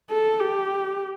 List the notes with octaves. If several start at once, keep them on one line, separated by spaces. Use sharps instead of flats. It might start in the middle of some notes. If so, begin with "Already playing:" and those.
A4
G4